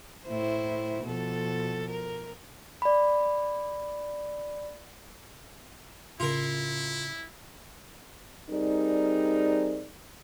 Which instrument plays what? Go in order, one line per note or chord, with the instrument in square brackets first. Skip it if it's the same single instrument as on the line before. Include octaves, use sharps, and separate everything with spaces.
[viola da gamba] A2 E4 C5
B2 F3 A4
A#4
[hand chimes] D5 B5
[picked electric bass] A2 C#3 [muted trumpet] E4 [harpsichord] F4 A#4
[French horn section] G3 C4 D#4 G#4 A#4 D5